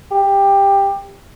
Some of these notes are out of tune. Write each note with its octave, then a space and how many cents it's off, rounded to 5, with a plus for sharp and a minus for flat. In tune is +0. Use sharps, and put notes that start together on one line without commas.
G4 +15